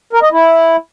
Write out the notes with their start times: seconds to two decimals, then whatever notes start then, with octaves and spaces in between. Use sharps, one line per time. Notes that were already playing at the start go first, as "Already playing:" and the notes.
0.13 A#4
0.23 D#5
0.32 E4